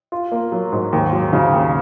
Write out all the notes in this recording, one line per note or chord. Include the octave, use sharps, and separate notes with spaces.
F4
A#3
F#3
G#2
D#2
F#3
C#3
D#2